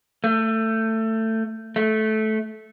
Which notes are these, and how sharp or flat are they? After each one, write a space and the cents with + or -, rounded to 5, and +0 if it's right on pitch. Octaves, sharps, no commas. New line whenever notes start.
A3 +20
A3 -15